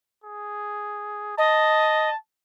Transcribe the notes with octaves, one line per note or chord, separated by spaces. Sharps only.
G#4
D#5 A5